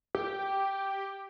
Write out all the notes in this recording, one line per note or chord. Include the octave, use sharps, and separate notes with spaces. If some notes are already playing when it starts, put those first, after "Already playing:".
G4